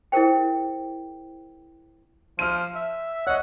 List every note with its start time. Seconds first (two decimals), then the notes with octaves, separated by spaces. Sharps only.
0.12 E4 G#4 A#4 C5 G5
2.39 F3 F6 D#7
2.75 E5
3.27 C#5 D#5 F#5